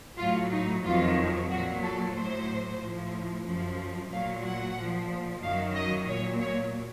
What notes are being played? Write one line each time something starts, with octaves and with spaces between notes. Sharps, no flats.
A2 F#3 F4
D#4
F2 D#3 F#3 F4
A#2 F#3 F#4
A4
A2 F#3 C5
A2 F3
F#2 F3
A#2 F#3 F5
F#5
A#2 F3
F#2 D#3 F#3 F5
D#5
A#2 F#3 C#5
C#5